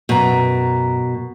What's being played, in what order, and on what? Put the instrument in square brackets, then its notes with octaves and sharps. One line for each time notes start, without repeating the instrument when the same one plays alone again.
[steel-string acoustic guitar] F#2 A#5 [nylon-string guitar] B2